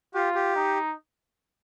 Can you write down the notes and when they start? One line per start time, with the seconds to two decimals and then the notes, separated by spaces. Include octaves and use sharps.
0.15 F4 G4
0.35 G4
0.56 D#4